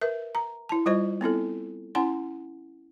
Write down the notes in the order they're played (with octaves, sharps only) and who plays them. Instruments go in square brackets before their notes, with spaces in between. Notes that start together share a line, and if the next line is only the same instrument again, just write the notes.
[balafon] A#4 B4 E5
A#5
E4 A5
G3 F4 C5 D#5
B3 C4 E4 A4
C#4 E4 F#5 G#5 C6